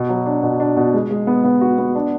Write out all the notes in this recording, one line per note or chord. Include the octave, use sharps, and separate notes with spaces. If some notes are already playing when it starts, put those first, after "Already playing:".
Already playing: B2
F#3
D4
B2
D4
B2
G#3
G#3
B3
B3
F#4
B3
D4